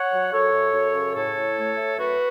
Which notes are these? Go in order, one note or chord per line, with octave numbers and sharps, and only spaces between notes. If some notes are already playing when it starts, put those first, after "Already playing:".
Already playing: C#5 F#5
F#3
F#2 A4 C#5
F#2
F#2
C#3
A2 A4 C#5
A2
A3
A3
F#2 F#4 B4